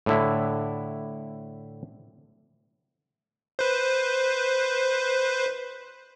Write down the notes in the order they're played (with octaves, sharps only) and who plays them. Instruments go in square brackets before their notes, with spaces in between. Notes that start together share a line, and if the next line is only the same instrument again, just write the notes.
[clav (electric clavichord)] A2 D3 E4
[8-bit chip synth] B4 C5